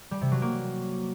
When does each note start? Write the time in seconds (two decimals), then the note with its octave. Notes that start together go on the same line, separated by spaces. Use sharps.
0.11 G3
0.21 C3
0.32 F#3
0.42 A#3